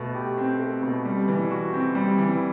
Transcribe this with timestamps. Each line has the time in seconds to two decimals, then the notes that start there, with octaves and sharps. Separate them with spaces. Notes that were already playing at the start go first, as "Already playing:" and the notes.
Already playing: B2 A3
0.14 G4
0.38 C4
0.60 A3
0.83 B2
1.05 G3
1.28 E3
1.51 F#4
1.73 C4
1.95 G3
2.18 E3